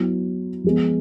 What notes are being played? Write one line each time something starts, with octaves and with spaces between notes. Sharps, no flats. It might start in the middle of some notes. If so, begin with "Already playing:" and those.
Already playing: F#3 B3 E4
F3 G#3 B3